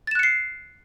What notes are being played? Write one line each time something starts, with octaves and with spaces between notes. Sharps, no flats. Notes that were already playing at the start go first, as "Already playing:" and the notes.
F#6 A6 C7 C#7 E7